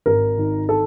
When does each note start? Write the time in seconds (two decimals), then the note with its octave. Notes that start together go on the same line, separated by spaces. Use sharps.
0.06 G#1 A#4
0.38 D#3
0.69 A4